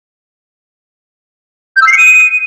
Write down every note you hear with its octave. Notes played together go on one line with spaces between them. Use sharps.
G6
E6
C7
C#7
D#7